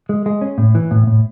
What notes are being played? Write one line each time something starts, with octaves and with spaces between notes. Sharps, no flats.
G#3
G#3
C#4
A2
E3
A2
A2